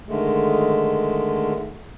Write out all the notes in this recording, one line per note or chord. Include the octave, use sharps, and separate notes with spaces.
D3 D#3 G#3 A3